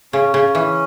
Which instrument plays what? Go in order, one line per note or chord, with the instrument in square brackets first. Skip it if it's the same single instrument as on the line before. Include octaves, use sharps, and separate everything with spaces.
[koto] C#3 [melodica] C#4
[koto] C#3
E3